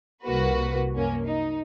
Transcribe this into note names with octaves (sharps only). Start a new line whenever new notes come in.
C2 A#3 F#4 B4
F#2 A#3 C#4
D#4